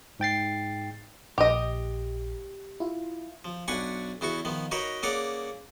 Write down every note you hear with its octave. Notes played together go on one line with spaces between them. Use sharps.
G#2 G5 A6 C7
A#1 G4 D#5
E4 F4
F3
B1 D4 B4 F#5 G#5 C#6
E2 B3 E4 F#4 C#6
D#3 F3 B3
D#4 F#4 A#4 B4 C#5 D#5
A#3 C#4 G#4 C#5 D5 F#5